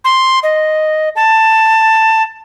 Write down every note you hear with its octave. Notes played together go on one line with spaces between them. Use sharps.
C6
D#5
A5